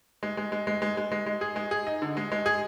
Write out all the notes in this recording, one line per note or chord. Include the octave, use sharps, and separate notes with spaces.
G#3
G#3
G#3
G#3
G#3
G#3
G#3
G#3
G#4
G#3
G#4
D#4
D3
G#3
G#3
G#4